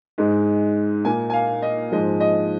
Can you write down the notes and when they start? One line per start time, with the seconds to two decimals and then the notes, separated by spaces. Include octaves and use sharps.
0.18 G#2 G#3
1.05 A#2 A#3 G#5
1.30 G#5
1.33 F5
1.62 D#5
1.92 G#2 F3 G#3 D#5
2.20 D#5